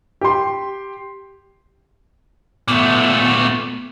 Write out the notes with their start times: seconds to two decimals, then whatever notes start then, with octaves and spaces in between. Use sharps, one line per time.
0.21 G4 C6
2.68 A#2 A3 B3